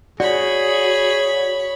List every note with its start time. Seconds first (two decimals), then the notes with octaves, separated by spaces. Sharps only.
0.20 F#4 G#4 C#5 D5 B5